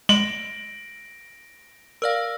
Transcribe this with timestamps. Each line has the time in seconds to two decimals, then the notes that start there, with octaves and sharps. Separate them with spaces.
0.09 G#3 A#6 D7 F#7
2.02 A#4 D5 F5 E6 F6 A#6